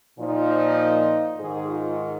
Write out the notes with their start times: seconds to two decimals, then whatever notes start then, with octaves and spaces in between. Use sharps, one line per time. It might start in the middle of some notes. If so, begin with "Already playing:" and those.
0.19 A#2 F3 D#4
1.37 G#2 D#3 G#4
1.67 F4